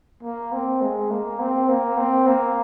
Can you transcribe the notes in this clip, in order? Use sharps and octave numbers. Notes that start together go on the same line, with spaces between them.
A#3
C4
G#3
A#3
C4
A#3
C4
A#3